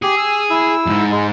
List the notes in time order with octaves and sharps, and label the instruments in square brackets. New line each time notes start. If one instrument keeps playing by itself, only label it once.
[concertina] G4 [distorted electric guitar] G#4
[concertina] E6
E4 E6
[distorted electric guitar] F2 G#2
[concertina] G#3